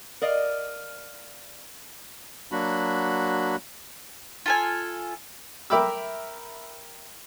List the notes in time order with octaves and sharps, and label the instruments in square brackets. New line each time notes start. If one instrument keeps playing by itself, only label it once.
[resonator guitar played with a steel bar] A#4 D5 D#5 F5
[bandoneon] F#3 A#3 D4 F#4 B5
[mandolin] F4 A4 G#5
[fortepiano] A#4 E5 G5 B5 D6 E6